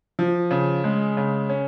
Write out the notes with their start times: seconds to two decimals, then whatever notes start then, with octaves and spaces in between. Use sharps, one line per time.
0.19 F3
0.51 C#3
0.84 G#3
1.17 C#3
1.50 C#4